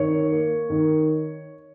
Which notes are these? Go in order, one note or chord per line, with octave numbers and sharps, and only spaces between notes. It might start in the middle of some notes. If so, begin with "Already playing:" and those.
Already playing: D#3 C#5
A#3
D#3